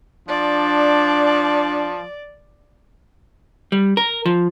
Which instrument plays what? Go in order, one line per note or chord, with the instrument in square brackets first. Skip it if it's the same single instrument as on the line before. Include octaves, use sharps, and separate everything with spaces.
[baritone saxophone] F3 [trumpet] D4 [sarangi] D5
[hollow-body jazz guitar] G3
A#4
F3